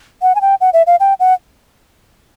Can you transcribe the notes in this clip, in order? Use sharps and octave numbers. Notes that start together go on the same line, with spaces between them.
F#5
G#5
G5
F#5
E5
F5
G5
F#5